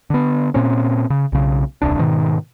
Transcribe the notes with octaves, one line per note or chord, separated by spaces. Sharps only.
D3 B3
A#2 C4 C#4
C#3
B1 C#3
D#1 C2 D4
G#2 B2 D#3